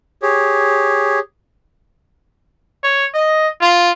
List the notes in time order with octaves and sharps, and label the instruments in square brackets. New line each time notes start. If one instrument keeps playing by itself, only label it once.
[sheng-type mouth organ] G4 G#4 C#5
[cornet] C#5
D#5
F4